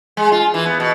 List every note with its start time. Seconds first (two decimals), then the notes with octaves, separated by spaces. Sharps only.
0.17 G#3
0.32 F4
0.54 E3
0.66 B3
0.80 B2